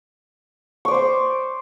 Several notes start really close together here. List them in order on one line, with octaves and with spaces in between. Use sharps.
C#6 D5 C5 D6